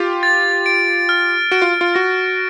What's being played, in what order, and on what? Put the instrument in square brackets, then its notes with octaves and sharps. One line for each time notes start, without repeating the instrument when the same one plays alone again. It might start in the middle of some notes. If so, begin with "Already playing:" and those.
Already playing: [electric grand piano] F4 G4
[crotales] A6
D7
F6
[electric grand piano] F#4 [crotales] D7
[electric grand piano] F4
F4
[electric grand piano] F#4 [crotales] A#6